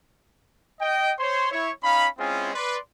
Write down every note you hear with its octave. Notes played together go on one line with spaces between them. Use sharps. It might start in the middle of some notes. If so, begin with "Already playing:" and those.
D#5 G5
C5 C#5 C6
E4 C#5
C#4 D#4 F5 B5
G#3 C4 C#4 E4 F4 G#4
B4 D5 C6